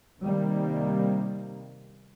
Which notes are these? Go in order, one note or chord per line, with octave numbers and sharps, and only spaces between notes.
C3 D#3 G3 A#3